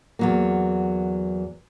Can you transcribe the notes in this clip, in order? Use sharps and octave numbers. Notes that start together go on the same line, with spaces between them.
E2 F#3 A#3